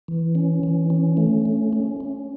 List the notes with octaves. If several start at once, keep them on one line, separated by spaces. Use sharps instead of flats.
E3
C#4
E3
C#4
A3
C#4
C#4
C#4